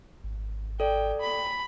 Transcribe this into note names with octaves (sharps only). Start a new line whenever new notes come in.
G#1
A4 D5 G5
B5